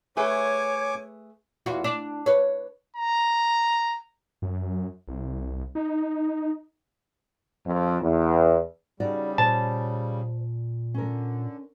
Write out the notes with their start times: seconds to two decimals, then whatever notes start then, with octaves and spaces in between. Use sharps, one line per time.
0.17 A3 G#4 B4 C#5 G#5 C#6 D6
1.66 E2 F4 F#4
1.84 D4
2.26 B4 C#5
2.96 A#5
4.42 F#2
5.08 C2
5.75 D#4
7.65 F2
8.01 E2
9.00 C#3 G3 D#4 F#4 D5
9.38 A#2 C5 A5
10.94 D3 C#4 A#4